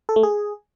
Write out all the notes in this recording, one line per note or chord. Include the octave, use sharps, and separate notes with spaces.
A4
A3
G#4